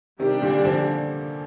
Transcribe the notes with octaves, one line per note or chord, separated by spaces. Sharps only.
C3 D#3 G3 D4 G4
A#2 D3
D3 F3